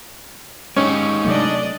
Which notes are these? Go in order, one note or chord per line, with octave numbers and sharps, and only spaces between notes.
G#3 C#4 D#4 G4
C3 F#3 A3 D4 D5 D#5